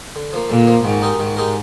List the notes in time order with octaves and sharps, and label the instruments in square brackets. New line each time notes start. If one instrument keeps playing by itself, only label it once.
[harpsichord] D3
F3 A#3
[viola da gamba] A#2 [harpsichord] D3
[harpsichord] F3 A#3
[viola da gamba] G#2 [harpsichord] D#3
[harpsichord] G#3 D#4 G4 A#4
[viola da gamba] G#2 [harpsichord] D#3
[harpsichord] G#3 D#4 G4 A#4